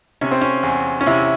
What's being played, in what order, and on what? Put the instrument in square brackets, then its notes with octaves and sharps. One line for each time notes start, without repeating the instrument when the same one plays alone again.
[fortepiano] C3 C#4
C4
C#4
E2
C#4
C3 E4